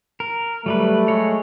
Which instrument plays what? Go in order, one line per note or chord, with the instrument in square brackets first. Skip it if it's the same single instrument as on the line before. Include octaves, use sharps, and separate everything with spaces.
[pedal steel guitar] A#4
[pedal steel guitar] F#3 G3 B4 [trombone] A3
[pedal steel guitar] G#3 C#5